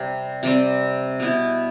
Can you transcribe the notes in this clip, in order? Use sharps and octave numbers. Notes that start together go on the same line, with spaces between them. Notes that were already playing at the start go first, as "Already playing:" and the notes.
Already playing: C3 G3 C4
C3 G3 C4
B2 B3 E4